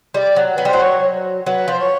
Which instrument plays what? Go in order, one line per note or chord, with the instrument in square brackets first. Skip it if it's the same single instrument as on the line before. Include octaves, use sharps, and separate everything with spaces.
[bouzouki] G3 [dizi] D5 D#5
[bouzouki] F#3
[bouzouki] F#3 [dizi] B4
[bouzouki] G3
[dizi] C5
[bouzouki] F#3
[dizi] C#5
[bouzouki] F#3 [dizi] B4
[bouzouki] F3 [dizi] C5
[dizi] C#5